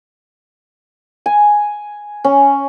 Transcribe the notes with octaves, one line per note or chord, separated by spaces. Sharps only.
G#5
C#4